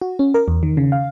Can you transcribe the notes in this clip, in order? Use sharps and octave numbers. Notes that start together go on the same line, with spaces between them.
F#4
C#4
A#4
E2
D#3
C#3
F5